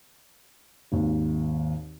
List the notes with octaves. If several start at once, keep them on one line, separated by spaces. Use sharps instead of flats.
G#1 D#2